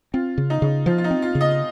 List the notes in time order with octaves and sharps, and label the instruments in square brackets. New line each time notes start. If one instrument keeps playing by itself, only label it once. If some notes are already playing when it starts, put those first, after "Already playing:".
[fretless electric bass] C4 [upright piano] F4
[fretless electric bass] C#3
[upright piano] D#4
[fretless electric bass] C#3
[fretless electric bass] F3 [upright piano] F4
[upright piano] F4
D#4
[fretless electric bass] C4
[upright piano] F4
[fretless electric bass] C#3
[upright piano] D#5